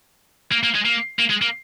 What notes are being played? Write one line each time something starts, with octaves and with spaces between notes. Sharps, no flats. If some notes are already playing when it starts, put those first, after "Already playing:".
A#3
A#3
G#3
A#3
A#3
G#3
A#3